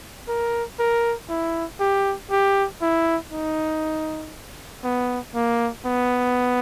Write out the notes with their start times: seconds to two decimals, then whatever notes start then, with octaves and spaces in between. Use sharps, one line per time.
0.28 A#4
0.79 A#4
1.29 E4
1.80 G4
2.30 G4
2.81 E4
3.32 D#4
4.84 B3
5.34 A#3
5.85 B3